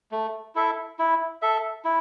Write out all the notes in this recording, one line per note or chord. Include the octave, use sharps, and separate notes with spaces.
A3
E4 A4 E5
E4
A4 E5
E4